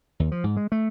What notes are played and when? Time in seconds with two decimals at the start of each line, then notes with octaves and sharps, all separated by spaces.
0.20 D#2
0.32 F3
0.44 G#2
0.57 G#3
0.72 A3